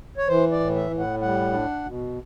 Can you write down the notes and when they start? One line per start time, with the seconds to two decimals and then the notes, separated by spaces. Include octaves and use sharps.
0.18 C#5
0.28 E3 C5
0.52 D5
0.60 A2
0.75 E5
0.91 A2
0.99 F#5
1.22 G3 F#5
1.53 D4
1.85 B2